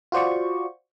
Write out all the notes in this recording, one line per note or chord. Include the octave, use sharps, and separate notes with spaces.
F4 F#4 C5 D5 C#6